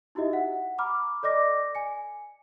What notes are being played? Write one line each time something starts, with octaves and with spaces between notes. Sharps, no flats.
D#4 E4 F#4 G4 D#5 E5
F#5
A#5 B5 D6 F6
A4 D5 D#5 D6 A#6
G#5 C#7